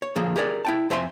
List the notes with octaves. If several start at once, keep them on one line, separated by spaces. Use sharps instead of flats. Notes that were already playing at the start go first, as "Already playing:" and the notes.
C#5
D3 F3 A#3 G#4
G4 G#4 A#4 D5
E4 G5 A5
F2 C5 E5 G#5 C6